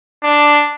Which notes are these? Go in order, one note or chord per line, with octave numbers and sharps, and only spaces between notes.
D4